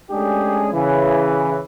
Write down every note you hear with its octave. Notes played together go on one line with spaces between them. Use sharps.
G#3 A3 C#4 D4 G4 G#4
C#3 E3